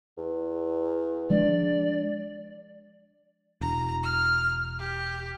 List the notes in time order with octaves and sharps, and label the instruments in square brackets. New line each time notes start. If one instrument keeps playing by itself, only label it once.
[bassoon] E2
[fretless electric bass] F3 G#3 D4 [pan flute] D5
[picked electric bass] E1 [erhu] A#5
[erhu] F6
G4